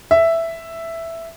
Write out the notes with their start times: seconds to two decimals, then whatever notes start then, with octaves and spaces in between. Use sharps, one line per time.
0.11 E5